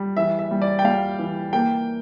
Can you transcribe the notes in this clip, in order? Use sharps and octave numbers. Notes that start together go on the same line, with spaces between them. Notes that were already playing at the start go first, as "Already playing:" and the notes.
Already playing: G3
E3 E5
E5
G3
D5
G5
G3 F5
E3
A#3 G5